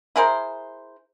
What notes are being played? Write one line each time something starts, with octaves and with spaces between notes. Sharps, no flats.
E4 G#4 A#4 C5